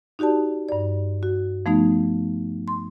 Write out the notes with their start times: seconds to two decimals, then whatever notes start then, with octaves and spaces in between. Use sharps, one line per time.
0.19 D#4 F#4 G4 D5 A5
0.69 G2 D5
1.23 F#4
1.66 F3 A3 B3 D#4
2.68 C6